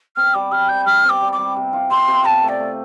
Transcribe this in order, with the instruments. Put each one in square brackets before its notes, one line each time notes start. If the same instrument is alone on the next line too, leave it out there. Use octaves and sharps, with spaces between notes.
[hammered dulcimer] C4 [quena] F6
[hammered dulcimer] G3 [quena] D6
[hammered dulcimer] G3 [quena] F6
[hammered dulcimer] G3 [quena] G6
[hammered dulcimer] G3 [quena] F6
[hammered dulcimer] C4
[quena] D6
[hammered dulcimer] G3
[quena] D6
[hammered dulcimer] G3
C3
F4
[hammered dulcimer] C3 [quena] C6
[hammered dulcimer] C3
[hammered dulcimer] C3 [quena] A5
[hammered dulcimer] A3
[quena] D5
[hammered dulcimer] A3